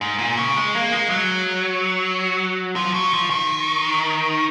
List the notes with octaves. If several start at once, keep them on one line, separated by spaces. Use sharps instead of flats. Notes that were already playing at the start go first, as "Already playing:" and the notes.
G#2
A#2
C#3
G#3
A#3
G#3
F#3
F3
F#3
F3
D#3